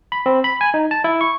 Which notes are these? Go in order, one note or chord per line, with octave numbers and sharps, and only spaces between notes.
B5
C4
B5
G#5
D#4
A5
E4
C#6